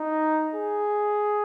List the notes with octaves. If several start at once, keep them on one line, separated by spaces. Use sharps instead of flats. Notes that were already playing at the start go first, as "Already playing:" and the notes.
Already playing: D#4
G#4